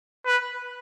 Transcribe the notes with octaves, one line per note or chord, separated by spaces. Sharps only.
B4